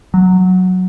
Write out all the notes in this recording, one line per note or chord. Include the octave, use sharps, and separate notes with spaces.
F#3